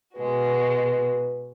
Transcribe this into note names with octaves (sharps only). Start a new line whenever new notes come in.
B2 G#3 F#4 B4